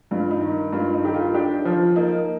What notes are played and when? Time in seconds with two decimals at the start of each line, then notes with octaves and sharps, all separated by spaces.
0.11 G2 F4
0.31 D#4
0.41 D#3
0.73 G2 F4
0.93 D#4
1.03 D#3 G4
1.14 F4
1.34 D4 G4
1.65 F3 F4
1.96 A#3 D#4